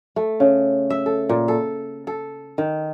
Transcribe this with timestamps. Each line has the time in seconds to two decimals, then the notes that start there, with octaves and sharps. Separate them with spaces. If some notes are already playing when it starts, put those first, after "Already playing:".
0.16 A3
0.40 C#3
0.90 E5
1.06 A4
1.29 A#2
1.48 A4
2.07 A4
2.58 D#3